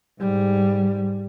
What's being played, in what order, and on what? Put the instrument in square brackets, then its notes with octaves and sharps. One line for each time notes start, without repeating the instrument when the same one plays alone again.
[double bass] G#2 G3